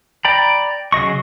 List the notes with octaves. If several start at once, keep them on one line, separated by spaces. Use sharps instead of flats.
D5 G5 A#5 B5
C#3 F#3 D#5 C#6